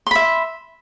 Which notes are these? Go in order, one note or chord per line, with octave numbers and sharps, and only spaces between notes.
E5 B5 C6